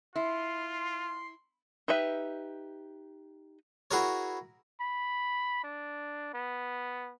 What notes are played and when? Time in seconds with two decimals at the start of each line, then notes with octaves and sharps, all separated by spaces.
0.16 E4 F4 C6
1.88 D#4 G4 B4 E5
3.91 E4 F#4 G#4 A#4 C#5
4.80 B5
5.63 D4
6.34 B3